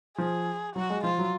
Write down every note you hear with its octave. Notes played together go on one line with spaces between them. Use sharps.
F3 G#4
F#3 F#4
G#3
F3 F4
F#3